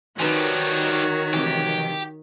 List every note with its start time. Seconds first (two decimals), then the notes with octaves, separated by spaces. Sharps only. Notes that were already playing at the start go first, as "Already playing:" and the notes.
0.20 D#3 F3 G3 F#4 B4 C#5 G#5
1.34 F2 C3 E3 G4